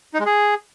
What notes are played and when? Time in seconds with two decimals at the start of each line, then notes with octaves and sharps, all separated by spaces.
0.14 D#4
0.20 G#3
0.26 G#4